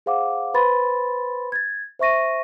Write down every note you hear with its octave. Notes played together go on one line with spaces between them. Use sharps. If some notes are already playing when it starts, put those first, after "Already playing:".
G#4 C5 F5 F#5 D6
B4 C5 B5 C6 A6
G#6 A6
C5 E5 C#6 A#6 D#7